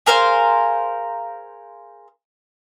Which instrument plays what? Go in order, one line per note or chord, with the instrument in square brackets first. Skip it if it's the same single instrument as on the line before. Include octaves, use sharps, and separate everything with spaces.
[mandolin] G#4 A#4 C5 F5